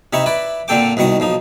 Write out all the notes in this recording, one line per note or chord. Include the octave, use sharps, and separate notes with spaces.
C3 D#4 E4 C#6
E4 B4 D5
A#2 D3 C4 A4 G5 D6
C2 B2 D#3 C#6 D#6
B1 F3 D#4